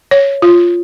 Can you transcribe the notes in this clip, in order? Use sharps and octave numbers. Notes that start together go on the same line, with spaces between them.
C#5
F4